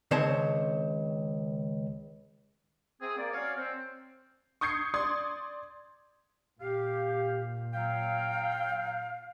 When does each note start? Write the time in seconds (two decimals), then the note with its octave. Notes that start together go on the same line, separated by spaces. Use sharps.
0.11 C#2 D#3 C4 C5 C#5 A5
3.01 C4 G#4
3.17 A#3 D5
3.33 F#3 C#4 C#5 D5 F5
3.57 C4
4.61 C#6 D#6 G6 G#6 C7 C#7
4.94 D5 C6 D#6 G#6
6.61 A#2 G4 F5
7.74 F#3 F5 G5